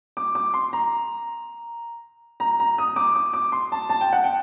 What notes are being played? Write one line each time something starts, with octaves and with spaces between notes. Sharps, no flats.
D6
D6
C6
A#5
A#5
A#5
D#6
D6
D6
D6
C6
A5
A5
G5
F#5
G5